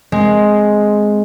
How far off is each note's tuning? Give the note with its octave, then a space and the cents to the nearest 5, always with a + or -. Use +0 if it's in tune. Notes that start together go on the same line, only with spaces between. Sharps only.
G#3 +5 C4 +0